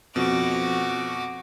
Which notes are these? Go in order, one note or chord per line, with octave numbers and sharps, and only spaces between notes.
F2 B2 F#4 D6